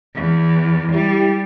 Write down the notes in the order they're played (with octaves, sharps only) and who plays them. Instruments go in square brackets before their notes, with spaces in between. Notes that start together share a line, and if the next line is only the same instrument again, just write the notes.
[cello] E2
[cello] G3 [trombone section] E4 G4